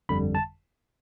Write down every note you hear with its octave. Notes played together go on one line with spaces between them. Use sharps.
G1 F2 D3 G3 B5
A5